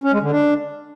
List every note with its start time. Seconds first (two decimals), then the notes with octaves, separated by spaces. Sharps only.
0.04 C#4
0.13 G#3
0.22 D3
0.31 D4